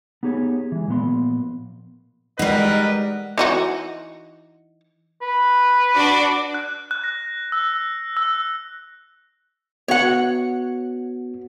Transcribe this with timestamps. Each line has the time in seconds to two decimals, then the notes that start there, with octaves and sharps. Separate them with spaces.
0.23 B3 D#4 G4 G#4 C#5
0.72 E3 G#3
0.88 A#2 F3 B3 C6
2.39 G3 G#3 D#4 A#4 B4 D#5 F#5
3.38 E3 D#4 F#4
5.22 B4
5.95 D4 F#4 D6
6.54 F#6
6.91 F#6
7.04 A#6
7.52 E6
8.17 E6
9.88 B3 F#4 C#5 F#5